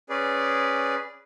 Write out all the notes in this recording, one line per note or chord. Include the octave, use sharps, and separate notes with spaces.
C#4 G#4 B4 D5